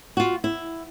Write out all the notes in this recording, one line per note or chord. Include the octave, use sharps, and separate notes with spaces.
F4 F#4
E4